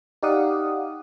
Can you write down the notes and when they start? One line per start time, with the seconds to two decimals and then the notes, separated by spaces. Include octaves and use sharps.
0.23 D#4 G4 D5 F5 F#5 D#6